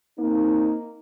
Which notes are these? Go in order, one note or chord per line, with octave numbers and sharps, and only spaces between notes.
A#3 C4 D#4